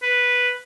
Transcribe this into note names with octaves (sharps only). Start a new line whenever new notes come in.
B4